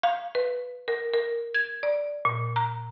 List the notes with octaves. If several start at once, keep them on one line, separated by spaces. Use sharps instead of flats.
F5
B4
A#4
A#4
G#6
D5
A#2
A#5